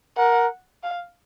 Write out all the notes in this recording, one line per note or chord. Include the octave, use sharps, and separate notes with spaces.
A#4 F#5
F5